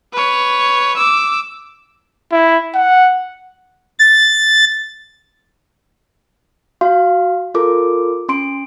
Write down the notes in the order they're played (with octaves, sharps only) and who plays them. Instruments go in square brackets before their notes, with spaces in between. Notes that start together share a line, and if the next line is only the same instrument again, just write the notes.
[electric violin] B4 C#5
D6 E6
[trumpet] E4
F#5
[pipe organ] A6
[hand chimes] F#4 F5 C6
F4 A4 A#4 D6
C#4 C6 D7